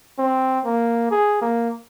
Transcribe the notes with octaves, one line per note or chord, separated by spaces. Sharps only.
C4
A#3
G#4
A#3